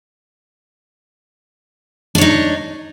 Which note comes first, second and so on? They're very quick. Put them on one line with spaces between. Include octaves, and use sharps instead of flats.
D4 C#5 D#4